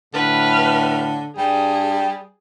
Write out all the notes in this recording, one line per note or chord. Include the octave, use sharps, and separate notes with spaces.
A2 D3 B4 F6
G2 G3 G#4